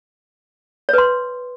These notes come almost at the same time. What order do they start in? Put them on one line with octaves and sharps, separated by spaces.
C#5 B4 C6